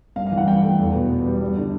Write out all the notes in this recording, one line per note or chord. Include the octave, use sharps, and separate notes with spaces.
G2 F5
F5
E3
F#5
G2 G5
A3
E2
B2
B3
G3
G2
D3